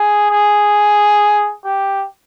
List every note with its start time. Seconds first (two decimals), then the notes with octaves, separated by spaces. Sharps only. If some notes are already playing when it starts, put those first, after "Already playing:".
Already playing: G#4
0.31 G#4
1.65 G4